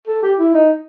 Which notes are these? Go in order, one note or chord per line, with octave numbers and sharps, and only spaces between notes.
A4
G4
E4
D#4